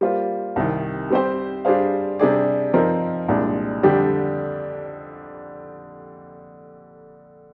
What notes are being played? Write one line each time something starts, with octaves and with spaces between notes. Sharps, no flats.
G3 A#3 F4 C5
C2 C3 D#3
G3 C4 G4 C5
G3 D4 G#4 C5 F5
C3 G3 D4 G#4 D5
F3 C4 D#4 A#4
C2 A#2 G#3 D4
F2 D3 G3 D4 G4